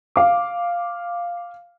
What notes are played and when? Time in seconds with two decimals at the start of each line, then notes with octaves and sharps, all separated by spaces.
0.16 F5 D6